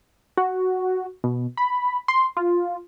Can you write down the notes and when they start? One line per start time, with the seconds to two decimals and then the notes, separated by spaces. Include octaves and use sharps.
0.37 F#4
1.24 B2
1.57 B5
2.08 C6
2.37 F4